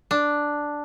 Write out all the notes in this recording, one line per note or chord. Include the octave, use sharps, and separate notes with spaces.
D4